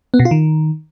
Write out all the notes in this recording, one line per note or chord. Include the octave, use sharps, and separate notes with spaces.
B3
B2
F4
D#3